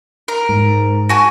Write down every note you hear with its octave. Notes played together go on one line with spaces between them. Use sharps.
A#4
G#2
F#4 G#5 A5